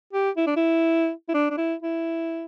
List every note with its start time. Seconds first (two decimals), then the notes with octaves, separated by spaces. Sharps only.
0.13 G4
0.37 E4
0.47 D4
0.57 E4
1.29 E4
1.34 D4
1.50 D4
1.58 E4
1.82 E4